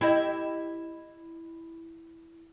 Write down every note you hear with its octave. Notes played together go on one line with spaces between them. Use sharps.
E4 G4 D#5